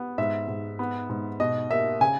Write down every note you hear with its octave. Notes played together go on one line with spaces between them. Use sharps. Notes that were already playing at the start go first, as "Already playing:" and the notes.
Already playing: B3
G#2 E5
G#2
B3
G#2
B2 D#5
A#3 E5
C#3 G#5